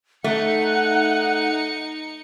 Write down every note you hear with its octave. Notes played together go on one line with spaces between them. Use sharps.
A3 D#4 F#5 C#7